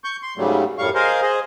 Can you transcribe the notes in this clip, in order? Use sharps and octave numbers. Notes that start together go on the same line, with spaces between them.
C#6 G6
C6
G#2 C#3 F#3 G3 A3
F#2 A2 G3 F5 C#6
G#4 A#4 C5 D#5 F5
G#4 C5 D#5